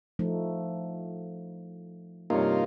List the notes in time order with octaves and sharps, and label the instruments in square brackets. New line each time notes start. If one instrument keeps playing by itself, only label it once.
[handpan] F3 A3 D#4
[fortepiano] G2 C3 C#5 [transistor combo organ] A#3 D#4 F4